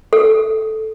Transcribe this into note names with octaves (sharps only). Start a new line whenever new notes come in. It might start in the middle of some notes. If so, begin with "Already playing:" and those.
A4